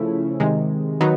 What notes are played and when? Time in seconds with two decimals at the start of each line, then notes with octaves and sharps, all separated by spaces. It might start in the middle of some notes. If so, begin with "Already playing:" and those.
Already playing: C#3 F3 A3 C#4 E4
0.40 C3 D#3 G#3
1.01 D#3 F#3 B3 D#4